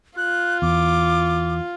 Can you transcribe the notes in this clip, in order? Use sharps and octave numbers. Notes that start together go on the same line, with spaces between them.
F4 F#6
E2 D6